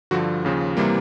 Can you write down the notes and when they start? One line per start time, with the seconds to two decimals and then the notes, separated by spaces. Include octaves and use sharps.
0.11 G2 D3 F3 F#4
0.45 D#2 C#3 F3
0.77 C3 E3 G3 A#3